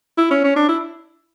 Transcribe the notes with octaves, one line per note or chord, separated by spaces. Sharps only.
E4
C#4
C#4
D4
E4